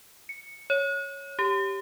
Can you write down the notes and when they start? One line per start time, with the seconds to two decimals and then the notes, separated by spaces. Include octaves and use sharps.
0.29 C#7
0.70 C#5
1.39 G4